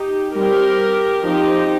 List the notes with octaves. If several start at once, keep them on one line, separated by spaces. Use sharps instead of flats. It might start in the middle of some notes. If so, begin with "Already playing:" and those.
Already playing: D#4 G4
G3 C4 G4 A#4
F3 C4 D#4 G4